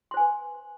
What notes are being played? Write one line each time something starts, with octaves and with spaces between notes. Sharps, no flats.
B4 C5 G#5 C6